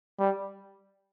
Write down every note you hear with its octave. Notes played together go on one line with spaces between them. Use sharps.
G3